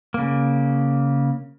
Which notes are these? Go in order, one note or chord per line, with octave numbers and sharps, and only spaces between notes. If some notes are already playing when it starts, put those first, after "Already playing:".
C#3 A#3